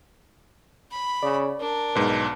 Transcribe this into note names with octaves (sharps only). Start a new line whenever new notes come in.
B5
C#3 D5
D4 A#4
B1 G#2 B4